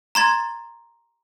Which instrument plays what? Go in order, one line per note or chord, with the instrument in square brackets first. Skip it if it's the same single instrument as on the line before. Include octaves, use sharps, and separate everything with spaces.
[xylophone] A#5 C6 G#6 A6